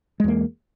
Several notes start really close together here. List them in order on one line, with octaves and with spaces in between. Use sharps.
G#3 E2 A#3